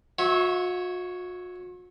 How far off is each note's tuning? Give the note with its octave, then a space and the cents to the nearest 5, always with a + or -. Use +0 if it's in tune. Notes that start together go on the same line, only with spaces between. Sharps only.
F#4 -45 C#5 +0 E5 -20